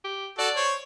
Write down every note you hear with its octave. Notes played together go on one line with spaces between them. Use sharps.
G4
F#4 A4 D5
C5 C#5